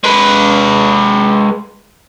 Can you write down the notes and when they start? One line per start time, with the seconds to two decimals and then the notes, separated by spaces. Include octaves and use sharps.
0.04 G#3 B4